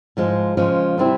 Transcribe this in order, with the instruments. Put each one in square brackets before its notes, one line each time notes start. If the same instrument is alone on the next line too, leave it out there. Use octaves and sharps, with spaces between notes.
[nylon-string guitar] G#2 F3 G#3
C#3 F3 G#3 C#4
C3 G3 C4 E4